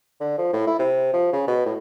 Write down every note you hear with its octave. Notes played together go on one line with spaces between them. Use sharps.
D3
F3
A2
E4
C3
F3
C#3
B2
A2